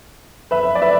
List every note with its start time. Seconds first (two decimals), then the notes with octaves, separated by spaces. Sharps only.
0.51 B4 E5
0.75 D5
0.82 B4 E5